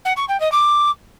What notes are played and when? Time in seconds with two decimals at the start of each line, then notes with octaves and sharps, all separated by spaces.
0.05 F#5
0.17 C#6
0.29 G5
0.40 D#5
0.52 D6